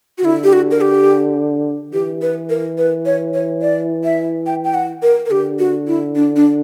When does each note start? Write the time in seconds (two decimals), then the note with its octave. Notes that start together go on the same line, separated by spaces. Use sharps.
0.18 F#4
0.25 D3 E4
0.44 G4
0.53 F#4
0.71 A#4
0.81 G4
1.93 E3 G4
2.22 B4
2.49 A#4
2.78 B4
3.06 C#5
3.34 C#5
3.62 D5
4.04 E5
4.46 G5
4.64 G5
4.74 F#5
5.02 A#4
5.26 A#4
5.31 D3 G4
5.59 F#4
5.87 E4
6.15 D4
6.36 D4